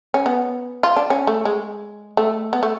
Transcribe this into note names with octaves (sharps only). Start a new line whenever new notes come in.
C#4
B3
F4
D4
C#4
A3
G#3
A3
B3
A3